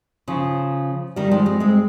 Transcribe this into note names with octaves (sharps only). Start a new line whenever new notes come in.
C#3 F3
D#3 G3
F3 G#3
G#3 C4
G#3 C4